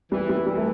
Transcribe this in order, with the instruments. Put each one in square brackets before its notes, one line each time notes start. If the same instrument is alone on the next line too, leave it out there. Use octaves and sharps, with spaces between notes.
[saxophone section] E3 [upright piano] G3
[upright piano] G3
[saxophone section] E3 [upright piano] G3
[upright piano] A3